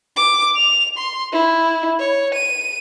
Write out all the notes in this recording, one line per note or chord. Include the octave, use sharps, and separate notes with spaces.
D6
F7
C6
E4
C#5
D#7